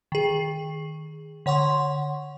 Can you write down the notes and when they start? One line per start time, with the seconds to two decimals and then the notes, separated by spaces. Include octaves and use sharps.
0.12 D#3 G#4
1.46 D3 C#5 F#5 C6 C#6